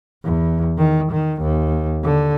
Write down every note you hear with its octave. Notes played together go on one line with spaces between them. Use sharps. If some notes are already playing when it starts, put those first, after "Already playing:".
E2
D#3
D#3
D#2
D3